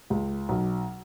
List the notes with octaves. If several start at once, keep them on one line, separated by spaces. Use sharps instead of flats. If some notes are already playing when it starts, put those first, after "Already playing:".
C#2
B1